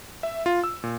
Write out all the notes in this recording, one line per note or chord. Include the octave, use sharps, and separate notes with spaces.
E5
F4
E6
A#2